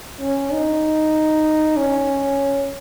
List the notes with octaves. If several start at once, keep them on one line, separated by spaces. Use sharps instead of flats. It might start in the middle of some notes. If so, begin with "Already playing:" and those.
C#4
D#4
C#4